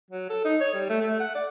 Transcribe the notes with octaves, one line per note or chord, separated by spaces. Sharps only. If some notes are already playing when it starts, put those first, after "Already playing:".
F#3
A4
D#4
C#5
G3
A3
A3
F#5
D5